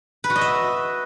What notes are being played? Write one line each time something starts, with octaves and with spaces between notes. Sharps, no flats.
B4
F#4
D#5
E5